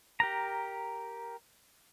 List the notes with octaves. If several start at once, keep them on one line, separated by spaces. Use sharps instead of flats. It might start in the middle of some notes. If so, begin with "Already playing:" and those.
G4 A#4 A#5